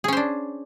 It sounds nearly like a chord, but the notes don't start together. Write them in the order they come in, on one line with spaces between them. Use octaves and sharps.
G#4 C#4 C5 D4